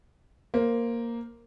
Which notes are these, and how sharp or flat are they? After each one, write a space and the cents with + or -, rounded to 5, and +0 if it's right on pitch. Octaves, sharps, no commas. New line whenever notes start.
A#3 +0 C5 +0